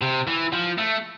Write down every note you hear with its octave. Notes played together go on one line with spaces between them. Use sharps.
C3
E3
F3
A3